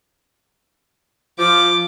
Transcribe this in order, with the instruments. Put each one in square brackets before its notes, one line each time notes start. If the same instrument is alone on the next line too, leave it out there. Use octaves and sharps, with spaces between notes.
[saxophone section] F3 [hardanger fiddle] D6